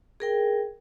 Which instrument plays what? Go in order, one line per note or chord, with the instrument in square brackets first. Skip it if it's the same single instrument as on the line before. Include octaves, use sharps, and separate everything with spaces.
[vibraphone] G#4 A#4 G5